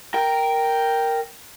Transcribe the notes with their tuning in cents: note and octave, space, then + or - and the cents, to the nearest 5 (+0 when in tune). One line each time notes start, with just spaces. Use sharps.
A#4 +0 G5 +0